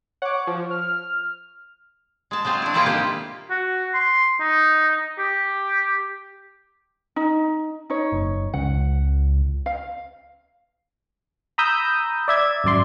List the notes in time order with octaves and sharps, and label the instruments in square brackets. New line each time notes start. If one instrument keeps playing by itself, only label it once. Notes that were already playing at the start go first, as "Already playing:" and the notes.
[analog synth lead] C#5 [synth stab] F#5 D6
[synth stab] F3
[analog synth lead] F6
[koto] G#3 A5
F#3 G#3 C4 F4
D4 E4
C3 G3 G#3 A#3 E4 F4
C3 D#3 A#3 G4
[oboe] F#4
C6
D#4
G4
[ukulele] D#4
D#4 C#5
[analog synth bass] F#1
[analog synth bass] C#2 [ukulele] F#5
[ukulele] F5
[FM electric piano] A#5 B5 D#6 E6 G6
D5 E5 G#6
G#1 F#2 D5 C6